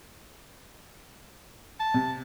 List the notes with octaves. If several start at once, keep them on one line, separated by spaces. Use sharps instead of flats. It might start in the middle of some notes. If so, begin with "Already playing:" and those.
A5
C3